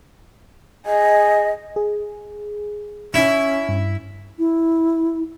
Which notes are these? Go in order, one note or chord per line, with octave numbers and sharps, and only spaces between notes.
G#4 D#5
G#4
C#4 E4
G2
E4